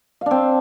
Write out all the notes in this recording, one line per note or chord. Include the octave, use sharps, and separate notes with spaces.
C4 D4 F5